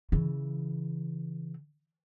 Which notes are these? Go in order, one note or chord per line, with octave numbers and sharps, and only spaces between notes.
C#3 E3